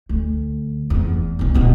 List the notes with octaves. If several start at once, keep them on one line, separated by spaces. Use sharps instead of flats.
D2
F1 E2
C2 B2
D#1 B2